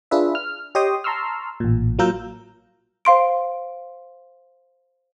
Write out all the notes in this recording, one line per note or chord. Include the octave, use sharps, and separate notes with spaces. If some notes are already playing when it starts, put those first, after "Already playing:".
D4 F4 G#4 B4 E5
F6
G4 C#5 D#5 G5 C6 D#6
A5 A#5 C6 C#6 E6 F6
A1 A#2
F#3 A#3 F4 A#4 E6 G6
C5 F5 C6 D7